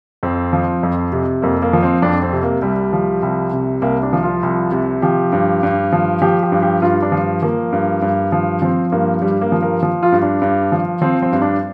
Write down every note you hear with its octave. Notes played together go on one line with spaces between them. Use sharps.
F2 C4
F3
F2
C3
F2 A#3
A#3
F3
C4
F2 D4
C4
C3
A#3
C2 G3
F3
C2
C3
C2 A#3
D4
F3
F4
C2
C3
F3 G4
G2
G2
F3
F3 G4
G4
G2
G4
G2 F4
D4
F3
F3 A#3
G2
G2
F3
F3 C4
G2 A#3
G2 G3
A#3
F3
A#4
F3
F4
G2
D4
G2
F3
F3 C4
C4
G2
D4